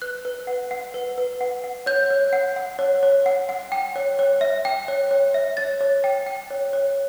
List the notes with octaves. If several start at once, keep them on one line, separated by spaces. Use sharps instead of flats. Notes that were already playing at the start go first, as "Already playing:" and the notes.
B4 F#6
B4
F#5
F#5
B4
B4
F#5
F#5
C#5 G6
C#5
F#5
F#5
C#5
C#5
F#5
F#5
G5
C#5
C#5
E5
G5
C#5
C#5
E5
C#5 A6
C#5
G5
G5
C#5
C#5